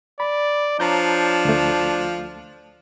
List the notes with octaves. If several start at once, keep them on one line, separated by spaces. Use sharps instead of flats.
D5 B5
F3 D4 C#5 A#5 G6
D2 A3